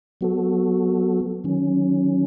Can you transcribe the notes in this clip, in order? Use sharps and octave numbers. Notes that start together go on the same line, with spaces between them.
F#3 B3 F#4 A4
D#3 F#3 C#4